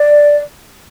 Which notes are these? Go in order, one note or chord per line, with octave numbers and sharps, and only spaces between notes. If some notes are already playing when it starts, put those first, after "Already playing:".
Already playing: D5